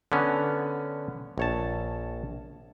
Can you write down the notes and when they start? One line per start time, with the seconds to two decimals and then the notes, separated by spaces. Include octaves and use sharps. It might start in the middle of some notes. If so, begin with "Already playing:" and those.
0.12 D3 B3 C#4
1.38 A#1 C#5 A5